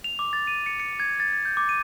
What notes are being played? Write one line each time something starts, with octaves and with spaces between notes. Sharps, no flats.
F7
D6
A6
D#7
C#7
C#7
G#6
A6
A6
G6
D6
D#7